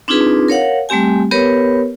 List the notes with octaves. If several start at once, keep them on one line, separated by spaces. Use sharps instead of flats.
C4 D4 D#4 F4 G#4 B4
A#4 C#5 F5 F#5
G3 A3 C4 G4 G#5
B3 G4 A#4 B4 C#5